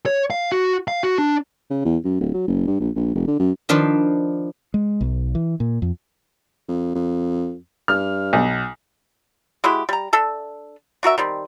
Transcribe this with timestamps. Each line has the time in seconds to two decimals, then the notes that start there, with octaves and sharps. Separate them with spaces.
0.06 C#5
0.30 F5
0.52 F#4
0.88 F5
1.03 F#4
1.18 D4
1.70 C#3
1.85 E2
2.04 F#2
2.20 D1
2.34 F#3
2.47 F#1
2.67 G2
2.80 A#1
2.96 A#1
3.15 F1
3.27 D3
3.39 F#2
3.69 D#3 F3 D4 B4 C5
4.74 G#3
5.01 B1
5.35 E3
5.60 A#2
5.82 F2
6.68 F2
6.95 F2
7.88 G2 F6
8.33 B1
9.64 G#3 E4 F#4 G4
9.89 G3 A#5
10.13 D4 A4 E5
11.03 D4 F#4 A#4 E5
11.18 D#3 G3 C4